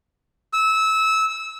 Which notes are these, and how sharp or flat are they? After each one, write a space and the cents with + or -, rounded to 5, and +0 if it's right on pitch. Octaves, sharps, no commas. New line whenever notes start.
E6 -20